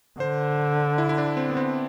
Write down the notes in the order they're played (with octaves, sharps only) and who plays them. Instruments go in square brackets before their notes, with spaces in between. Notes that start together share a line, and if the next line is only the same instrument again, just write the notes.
[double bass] D3 [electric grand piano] C5
[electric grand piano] E4
E4
D4
C4
B3
C4